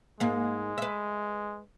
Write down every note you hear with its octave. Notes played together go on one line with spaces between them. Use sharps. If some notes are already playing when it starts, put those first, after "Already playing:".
G#2 G#3 A#3
B4 E5